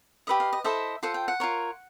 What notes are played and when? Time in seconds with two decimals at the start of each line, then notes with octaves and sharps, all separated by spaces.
0.27 G4 B4 D#5 E5
0.40 F5
0.53 D#5
0.64 E4 A4 C5 D#5 E5
1.03 F4 A4 C5 F#5
1.14 G5
1.28 F#5
1.40 F4 A#4 C#5